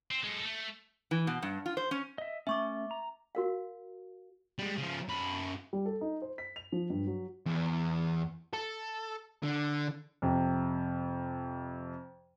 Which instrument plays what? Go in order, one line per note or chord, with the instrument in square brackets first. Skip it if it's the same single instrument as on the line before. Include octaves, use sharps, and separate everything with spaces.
[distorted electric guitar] C4
G#3 A4
A3
[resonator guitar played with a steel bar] E3
B2
G2
F4
C5
C#4
[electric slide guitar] D#5 E5
[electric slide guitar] A3 C#4 [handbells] E5 C#6 D6
[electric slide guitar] A#5
[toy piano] F#4 A#4 F5
[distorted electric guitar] G3 G#3
C#3 F3
F#2 B5
[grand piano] G3
A4
D#4
C5
B6
F7
F3
G2
F#3
[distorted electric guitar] E2
A4
D3
[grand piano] F2 C3